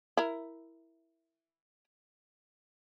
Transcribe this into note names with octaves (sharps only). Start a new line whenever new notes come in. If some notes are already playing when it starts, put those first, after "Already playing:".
E4 A#4